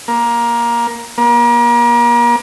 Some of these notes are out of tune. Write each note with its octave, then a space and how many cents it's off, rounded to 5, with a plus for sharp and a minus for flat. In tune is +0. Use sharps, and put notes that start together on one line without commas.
A#3 +15
A#3 +35